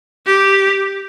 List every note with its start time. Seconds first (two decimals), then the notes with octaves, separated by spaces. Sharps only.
0.26 G4